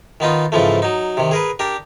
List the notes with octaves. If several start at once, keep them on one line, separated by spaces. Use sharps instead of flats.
D#3 B3 D#4 F4
G#2 C#3 E3 F3 A3
F#3 D#4
C3 D#3
G#4 A#4 B4
D4 G4 A#4